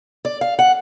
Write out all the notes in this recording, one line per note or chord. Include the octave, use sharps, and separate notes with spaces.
D5
F5
F#5